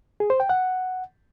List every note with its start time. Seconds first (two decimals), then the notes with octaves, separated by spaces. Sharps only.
0.20 G#4
0.30 C5
0.40 G5
0.49 F#5